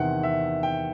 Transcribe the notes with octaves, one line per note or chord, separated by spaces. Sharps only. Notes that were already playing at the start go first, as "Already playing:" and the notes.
Already playing: E2 C3 D#3 F#5
E5
G5